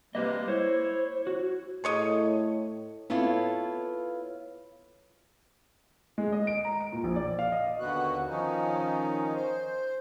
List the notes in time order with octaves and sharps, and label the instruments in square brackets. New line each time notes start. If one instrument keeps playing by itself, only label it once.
[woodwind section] G3 G#3 A#3 [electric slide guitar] G4 B4 D#5
[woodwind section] E4 C#5 [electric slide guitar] C5
[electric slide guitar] F#4
[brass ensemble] A2 [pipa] G#4 C#5 D#5
[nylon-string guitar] B3 E4 F4 A4 C#5
[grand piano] G#3
D#5
D7
A#5
D7
A#2
A#1
D5
F5
D#5
[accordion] D#2 D3 B3 F#4 F#6
D#3 F3 C#4 D#4
C5